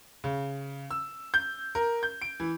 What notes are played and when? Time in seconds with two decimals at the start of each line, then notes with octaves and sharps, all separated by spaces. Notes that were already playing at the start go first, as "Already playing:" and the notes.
0.24 C#3
0.91 E6
1.34 G6
1.75 A#4
2.03 G6
2.22 D7
2.40 E3